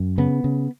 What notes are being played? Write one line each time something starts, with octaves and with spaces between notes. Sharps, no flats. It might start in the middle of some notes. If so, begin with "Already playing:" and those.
Already playing: F#2
C#3 B3
C#3